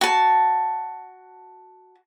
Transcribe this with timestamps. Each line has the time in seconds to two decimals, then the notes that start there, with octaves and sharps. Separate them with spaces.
0.01 F#4 A5